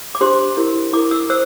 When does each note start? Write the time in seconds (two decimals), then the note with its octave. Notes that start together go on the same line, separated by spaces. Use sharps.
0.15 D6
0.21 D4 G4 C5 C6
0.57 E4 G4 A#4
0.93 E4 D6
0.97 A#4
1.11 E6
1.30 C5 E6